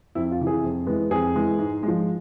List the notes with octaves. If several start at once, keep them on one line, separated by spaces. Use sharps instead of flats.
F2 E4
F4
C3 E3
G#4
F2
E3 G#3 B3
F2 G#4
E3 G#3 B3
G#2
F3 G#3